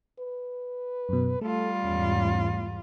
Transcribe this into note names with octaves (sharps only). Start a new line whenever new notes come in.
B4
F#2 B2
G3 A3 F4 A4
E2 G#2 C#4